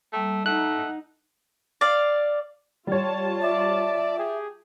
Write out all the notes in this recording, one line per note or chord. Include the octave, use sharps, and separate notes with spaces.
G3 A3 A#3 G5
A3 D#4 F#5 F#6
D5 F5
G3 F4 C#5 A5
D5 E5
G4 G#4